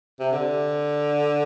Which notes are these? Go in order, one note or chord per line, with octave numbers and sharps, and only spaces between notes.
C3
D3